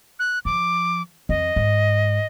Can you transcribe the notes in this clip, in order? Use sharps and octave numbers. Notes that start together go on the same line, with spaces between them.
F#6
F3 D6
F2 D#5
G#2